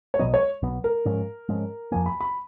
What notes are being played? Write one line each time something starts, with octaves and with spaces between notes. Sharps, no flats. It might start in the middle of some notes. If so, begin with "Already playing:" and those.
C#5
B1 B2 F#3 B3 D#5
C#5
B1 B2 F#3 B3
A#4
G#2 F3 G#3 C#4
G#2 F3 G#3 C#4
F2 F3 A#3 G#5
B5
B5